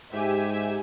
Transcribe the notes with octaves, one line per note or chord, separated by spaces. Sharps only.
G#2 G4 E5 G#5